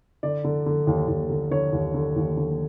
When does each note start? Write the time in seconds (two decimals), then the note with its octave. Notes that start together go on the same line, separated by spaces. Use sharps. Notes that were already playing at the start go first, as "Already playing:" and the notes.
0.23 D3 D5
0.44 D3
0.66 D3
0.87 D#2
1.08 D#2
1.30 D3
1.51 D3 C#5
1.73 D#2
1.94 D3
2.16 D#2
2.37 D3